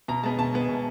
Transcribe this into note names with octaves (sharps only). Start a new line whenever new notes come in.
B2 A#5
G#3 B3 A5
B2 A5
G#3 B3
B2